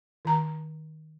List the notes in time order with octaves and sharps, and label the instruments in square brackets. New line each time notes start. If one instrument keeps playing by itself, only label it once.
[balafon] D#3 A#5